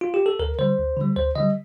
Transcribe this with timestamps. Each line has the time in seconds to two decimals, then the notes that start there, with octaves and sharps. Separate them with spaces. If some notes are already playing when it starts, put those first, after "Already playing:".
0.01 F4
0.14 G4
0.26 A4
0.39 D2 A#4
0.59 D3 G3 C5
0.78 D2
0.97 D3 G3
1.16 D2 C5
1.35 D3 G3 D#5